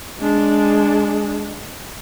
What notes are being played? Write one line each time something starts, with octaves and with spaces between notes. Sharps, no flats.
G#3 D4